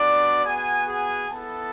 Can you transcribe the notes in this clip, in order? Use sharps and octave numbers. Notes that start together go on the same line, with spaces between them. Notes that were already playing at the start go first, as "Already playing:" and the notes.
Already playing: B3 D4 F#4 D5
B3 F#4 G#4 G#5
G#4 G#5
B3 E4 A4 A5